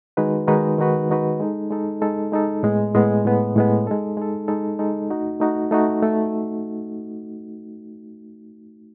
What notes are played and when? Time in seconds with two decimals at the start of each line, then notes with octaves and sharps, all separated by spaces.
0.17 D#3 G#3 D#4 F#4 B4
0.48 D#3 G#3 D#4 F#4 B4
0.78 D#3 G#3 D#4 F#4 B4
1.10 D#3 G#3 D#4 F#4 B4
1.40 G#3 D#4 A4
1.70 G#3 D#4 A4
2.02 G#3 D#4 A4
2.32 G#3 D#4 A4
2.63 A2 G#3 B3
2.95 A2 G#3 B3
3.24 A2 G#3 B3
3.56 A2 G#3 B3
3.87 G#3 D#4 A4
4.17 G#3 D#4 A4
4.48 G#3 D#4 A4
4.79 G#3 D#4 A4
5.10 A3 D#4 F#4
5.40 A3 D#4 F#4
5.71 A3 D#4 F#4
6.03 A3